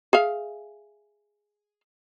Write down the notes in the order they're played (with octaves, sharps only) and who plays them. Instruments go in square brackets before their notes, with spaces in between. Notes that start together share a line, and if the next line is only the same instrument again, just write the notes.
[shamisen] G#4 E5 F5